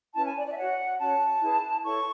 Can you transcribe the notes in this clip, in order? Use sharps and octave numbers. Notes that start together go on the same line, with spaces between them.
C#4 E4 B4 A5
G#5
D5
D5
E5
F#4 C#5 F#5
C#4 F#4 C#5 A5
E4 G#4 B4
E4 A4 C#5 C#6